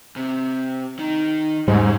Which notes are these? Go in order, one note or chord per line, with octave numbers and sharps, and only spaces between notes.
C3
D#3 D#4
E2 G#2 C#3 G3